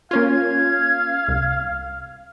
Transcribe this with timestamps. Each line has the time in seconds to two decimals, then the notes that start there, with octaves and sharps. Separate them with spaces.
0.11 A#3 C#4 F4 F5 G#6
1.28 C2